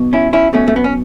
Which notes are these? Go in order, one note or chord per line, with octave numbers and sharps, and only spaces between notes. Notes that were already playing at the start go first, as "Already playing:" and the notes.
Already playing: B1 B2
C#4 E4
C#4 E4
B1 B2 A3 C#4
A3
B3
C#4